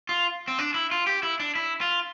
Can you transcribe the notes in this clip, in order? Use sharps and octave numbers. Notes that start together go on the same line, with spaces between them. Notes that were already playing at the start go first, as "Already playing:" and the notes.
F4
C4
D4
E4
F4
G4
E4
D4
E4
F4